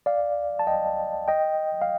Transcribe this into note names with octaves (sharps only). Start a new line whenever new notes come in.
D5 F5
A5
D#5 G5
D#5 G5
F5